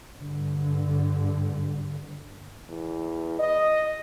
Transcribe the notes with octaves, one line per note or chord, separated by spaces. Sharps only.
G2 D3
E2
D#5